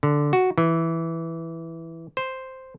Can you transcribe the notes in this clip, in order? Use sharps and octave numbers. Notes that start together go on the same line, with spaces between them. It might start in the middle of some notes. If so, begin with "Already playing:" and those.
D3
F#4
E3
C5